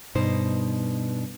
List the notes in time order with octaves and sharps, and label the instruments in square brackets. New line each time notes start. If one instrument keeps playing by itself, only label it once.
[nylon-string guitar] G2 B2 D#4 C5